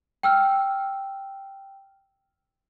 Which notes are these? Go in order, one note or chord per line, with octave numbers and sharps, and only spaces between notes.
G5 E6 F6